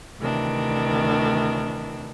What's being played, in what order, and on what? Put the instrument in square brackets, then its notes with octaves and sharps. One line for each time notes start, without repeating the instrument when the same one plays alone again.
[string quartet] D2 C3 D#3 E3 D4